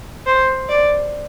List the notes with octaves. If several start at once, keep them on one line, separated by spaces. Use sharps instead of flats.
C5
D5